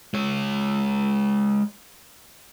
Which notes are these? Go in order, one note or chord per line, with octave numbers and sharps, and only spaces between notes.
G#3 C#5